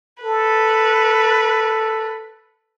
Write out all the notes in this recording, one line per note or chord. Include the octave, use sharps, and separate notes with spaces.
A4 B4